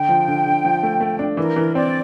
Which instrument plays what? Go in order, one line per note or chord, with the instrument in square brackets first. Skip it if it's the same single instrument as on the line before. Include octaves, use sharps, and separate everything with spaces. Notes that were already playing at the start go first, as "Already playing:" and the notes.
Already playing: [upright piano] D3 [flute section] G5
[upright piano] F3
D3
D3
F3
A3
A3
D4
[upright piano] E3 [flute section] A#4
[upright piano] E3
[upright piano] C4 [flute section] D5